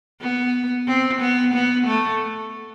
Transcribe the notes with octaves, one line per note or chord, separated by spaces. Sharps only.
B3
C4
B3
B3
A3